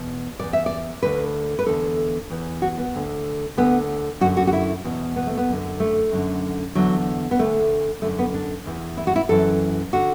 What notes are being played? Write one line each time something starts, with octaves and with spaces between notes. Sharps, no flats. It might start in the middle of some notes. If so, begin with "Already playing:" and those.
Already playing: E2 B2
E2 B2 D5
E5
D5
D2 D3 B4
B4
E2 D3 A4
E2 E3
F#4
B3
D2 D3
D2 D3 B3
F#2 D3 F#4
F#4
F#4
E4
E2 B2
B3
A3
B3
F#2 D3
A3
F#2 D3
E2 D3 F#3
B3
D2 D3 A3
F#2 D3 A3
B3
D4
E2 E3
E4
F#4
E4
F#2 E3 A4
D3 F#4